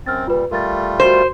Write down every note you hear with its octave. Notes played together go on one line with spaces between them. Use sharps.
F#2 C4 F6 A6
A#2 G3 F4 B4
G3 A3 F4 A#4 A6
F#4 A#4 C5